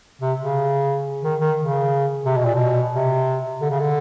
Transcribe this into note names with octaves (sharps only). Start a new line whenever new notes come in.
C3
C#3
D#3
D#3
C#3
C3
B2
A#2
B2
C3
D3
C#3
D3